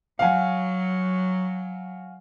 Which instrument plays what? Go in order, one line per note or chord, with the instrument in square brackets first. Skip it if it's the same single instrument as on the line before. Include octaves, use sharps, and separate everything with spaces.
[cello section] F#3 [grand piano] F5 F#5 G#5